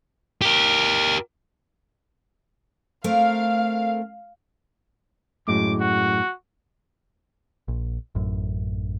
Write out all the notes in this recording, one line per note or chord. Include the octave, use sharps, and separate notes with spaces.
G4 A#4
A3 C4 A#4 F5
F#2 A2 G#3 D6
F#4
A#1
A1 F#2